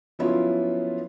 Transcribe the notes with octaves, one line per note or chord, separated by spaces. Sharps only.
F3 F#3 B3 C#4 E4 F4